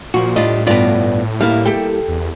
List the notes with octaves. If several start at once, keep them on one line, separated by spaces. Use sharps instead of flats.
A#2 F3 F#4
A2 G3 D4 F4 D5 D#5
G2 B2 B3 F4 D5
G3 A#3 E4 F5
G4 A4 G5
E2